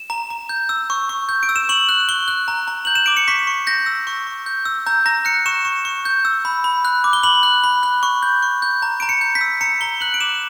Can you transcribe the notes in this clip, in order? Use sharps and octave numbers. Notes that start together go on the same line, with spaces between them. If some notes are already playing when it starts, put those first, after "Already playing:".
Already playing: E7
A#5
A#5
G6
E6
C#6
C#6
G6
D7
E6
E7
C#6 F#7
F#6
C#6 G7
F#6
A#5
A#5
G6 F#7
E7
D6 D7
C#7
C#6 B6
C#6
G6 A#6
E6
C#6
C#6
G6
E6
A#5 G6
A#5 A#6
F#6 C#7
C#6 E7
C#6
C#6
G6
E6
B5
B5
F#6
D6
G7
B5 F#7
F#6
B5
F#6
C#6
G6
C#6
G6
A#5
A#5 D7
C#7
G6
B6
E6
A#5 C#7
A#5 G7
F#6 F#7
D7
D6 E7